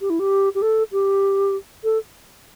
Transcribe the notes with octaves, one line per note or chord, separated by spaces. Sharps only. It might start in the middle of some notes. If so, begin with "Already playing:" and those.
G4
E4
G4
G4
A4
G4
A4